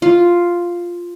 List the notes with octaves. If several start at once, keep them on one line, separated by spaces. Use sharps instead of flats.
F4